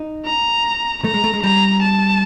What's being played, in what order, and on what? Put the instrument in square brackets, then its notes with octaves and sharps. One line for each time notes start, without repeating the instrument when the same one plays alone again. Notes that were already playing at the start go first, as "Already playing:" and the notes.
Already playing: [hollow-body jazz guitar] D#4
[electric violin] A#5
[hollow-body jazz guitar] A3 [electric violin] A#5
[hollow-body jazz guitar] G#3
A3
G#3
[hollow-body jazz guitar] G3 [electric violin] A#5
[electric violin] A5